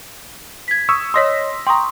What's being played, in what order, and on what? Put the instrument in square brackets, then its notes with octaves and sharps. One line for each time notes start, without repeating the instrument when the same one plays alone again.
[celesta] G#6 B6
[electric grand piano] C#6 D#6 E6
[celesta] C#5 D#5 D#6 [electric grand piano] C6 A#6 B6
[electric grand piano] G5 A#5 [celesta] C6 C#6 D#6